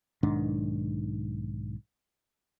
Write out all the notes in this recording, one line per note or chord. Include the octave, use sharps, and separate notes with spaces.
B1 G#2 D#3 D4